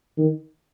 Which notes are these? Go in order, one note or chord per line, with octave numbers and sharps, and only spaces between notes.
D#3